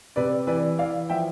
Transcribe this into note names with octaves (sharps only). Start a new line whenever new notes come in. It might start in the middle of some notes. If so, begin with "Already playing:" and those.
C3 B4 D5
E3 B4 D5
E3 D5 F5
F3 E5 G5